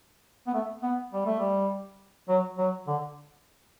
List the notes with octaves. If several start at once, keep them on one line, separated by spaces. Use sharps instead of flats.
B3
A3
B3
G3
A3
G3
F#3
F#3
D3